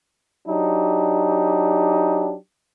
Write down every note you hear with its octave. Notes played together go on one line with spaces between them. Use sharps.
F#3 D4 D#4 G4